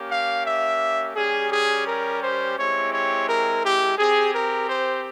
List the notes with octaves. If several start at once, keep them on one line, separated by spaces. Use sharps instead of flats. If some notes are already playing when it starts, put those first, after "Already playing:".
Already playing: A#3 C#4 G4
F5
E5
G3 C#4 G4 G#4
G#4
A#4
C5
G#3 C4 E4 G4 C#5
C#5
A#4
G4
C4 G4 G#4
A#4
C5